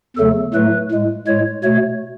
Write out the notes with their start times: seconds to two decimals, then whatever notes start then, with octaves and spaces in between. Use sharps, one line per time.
0.17 E2 C#3 F#3 A3 A4
0.54 A2 F#3 A3 B4
0.91 A2 G#3
1.27 A2 G#3 C#5
1.64 B2 A3 C#5